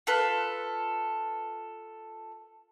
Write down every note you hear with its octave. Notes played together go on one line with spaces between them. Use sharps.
F4 A4 B4